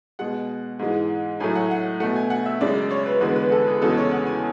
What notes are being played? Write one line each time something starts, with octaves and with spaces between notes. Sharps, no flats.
B2 G#3 F#5
G#2 E3 G#3
A2 F#3 A3 G#5
F#5
F#5
B2 A3 F#5
G#5
F#5
E5
F#2 C#3 G#3 D5
C#5
B4
E2 D3 G#3 B4
B4
A4
G#4
E2 C#3 G#3 A4
C#5
F#5
G#5